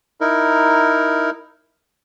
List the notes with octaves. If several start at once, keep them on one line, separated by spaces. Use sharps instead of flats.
D#4 E4 A#4